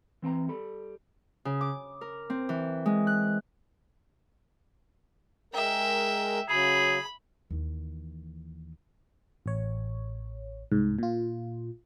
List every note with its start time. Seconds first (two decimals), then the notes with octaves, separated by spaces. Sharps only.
0.22 E3 C4 G5 A#5
0.48 G3 A4 B5
1.45 C#3
1.61 D6
2.01 A#4
2.30 C4
2.49 E3
2.86 G#3
3.07 F#6
5.54 G#3 A#4 E5 G5
6.49 C#3 F#3 G#4 B5
7.50 D#2 E3
9.46 A1 C#5
10.72 C2 G#2
10.99 A#2 F4